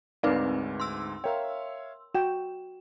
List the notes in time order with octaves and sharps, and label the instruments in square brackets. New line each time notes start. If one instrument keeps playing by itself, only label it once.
[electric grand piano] D2 G#2 [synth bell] C4 D#4 B4 [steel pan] A#4 D5 F5
[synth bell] C6 E6
[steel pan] A#4 G5 [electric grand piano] C#5 E5 F5
[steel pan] F#4 G5 [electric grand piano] E7